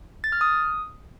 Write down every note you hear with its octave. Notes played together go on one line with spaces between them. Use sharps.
A6
F6
D#6